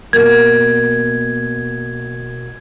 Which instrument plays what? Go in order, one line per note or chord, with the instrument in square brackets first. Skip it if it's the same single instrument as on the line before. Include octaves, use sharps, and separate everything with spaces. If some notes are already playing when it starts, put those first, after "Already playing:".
[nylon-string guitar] B2 A#3 [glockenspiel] G#6